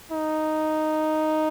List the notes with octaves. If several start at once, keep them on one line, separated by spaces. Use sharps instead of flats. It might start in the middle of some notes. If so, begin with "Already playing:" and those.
D#4